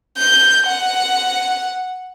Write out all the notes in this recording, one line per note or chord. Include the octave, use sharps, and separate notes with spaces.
G6
F#5